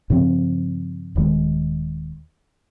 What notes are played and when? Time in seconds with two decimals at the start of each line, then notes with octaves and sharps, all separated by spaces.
0.10 G2 C#3 F3 C4
1.16 D#1 D#3 G#3